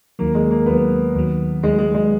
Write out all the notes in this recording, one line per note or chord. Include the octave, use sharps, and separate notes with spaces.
D#2 D#3 F#3 A#3
G#3
A#3
D#2 D#3 F#3 B3
D#2 D#3 F#3
D#2 D#3 F#3 G#3
G#3
G#3